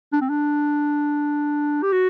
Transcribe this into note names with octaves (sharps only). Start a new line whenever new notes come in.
D4
C4
D4
G4
F#4